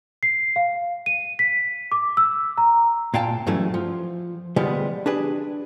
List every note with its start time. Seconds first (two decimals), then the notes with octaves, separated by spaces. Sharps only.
0.23 C7
0.56 F5
1.06 D#7
1.39 B6
1.92 D6
2.17 E6
2.58 A#5
3.14 A#2 F5 G5 A5
3.47 G2 E3 F#3 A3 C#4
3.74 F3
4.56 D3 F3 G3 G#3 B3
5.06 D4 G4 G#4 B4